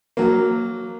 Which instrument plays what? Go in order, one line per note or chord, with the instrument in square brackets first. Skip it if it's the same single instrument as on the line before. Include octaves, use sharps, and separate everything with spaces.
[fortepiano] F#3 A#3